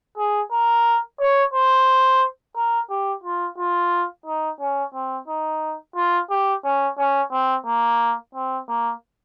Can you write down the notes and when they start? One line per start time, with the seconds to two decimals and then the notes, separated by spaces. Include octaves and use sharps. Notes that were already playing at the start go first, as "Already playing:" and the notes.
0.17 G#4
0.51 A#4
1.20 C#5
1.54 C5
2.56 A#4
2.90 G4
3.24 F4
3.58 F4
4.26 D#4
4.60 C#4
4.94 C4
5.28 D#4
5.96 F4
6.30 G4
6.64 C#4
6.98 C#4
7.32 C4
7.67 A#3
8.35 C4
8.68 A#3